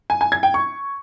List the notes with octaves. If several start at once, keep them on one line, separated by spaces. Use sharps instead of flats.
G#5
G#5
G#6
G5
C#6